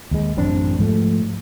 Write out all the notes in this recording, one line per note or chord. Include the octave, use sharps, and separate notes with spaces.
D#2 G#3
A1 F#2 C4 D4
G#2 F3 A3